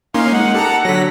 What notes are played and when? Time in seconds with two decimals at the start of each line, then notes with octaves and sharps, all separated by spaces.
0.14 A#3 C#4 D#4 F5 C6
0.32 G#3 D#4 F#5
0.54 G4 A4 A5 A#5
0.85 D3 F#3 A#6 B6